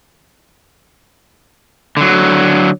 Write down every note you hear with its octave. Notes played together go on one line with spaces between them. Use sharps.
D3 F#3